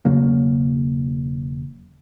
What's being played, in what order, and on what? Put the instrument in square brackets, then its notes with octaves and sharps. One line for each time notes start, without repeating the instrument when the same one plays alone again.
[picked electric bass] E1 C#3 F#3 A#3